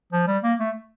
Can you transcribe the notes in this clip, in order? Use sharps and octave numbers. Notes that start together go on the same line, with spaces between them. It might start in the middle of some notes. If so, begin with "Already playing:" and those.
F3
G3
A#3
A3